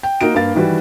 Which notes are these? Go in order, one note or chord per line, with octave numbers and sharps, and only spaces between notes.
G5
A#3 D#4 F#4 D7
G2 A#3 F5 A6
D#3 E3 G3 F#4 B4